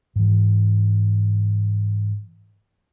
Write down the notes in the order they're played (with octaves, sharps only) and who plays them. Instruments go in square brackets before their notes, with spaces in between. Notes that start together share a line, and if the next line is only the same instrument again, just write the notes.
[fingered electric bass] G#2 E3